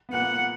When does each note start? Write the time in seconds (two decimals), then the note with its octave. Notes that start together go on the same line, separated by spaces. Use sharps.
0.09 B3
0.13 A#2 A#3 F#5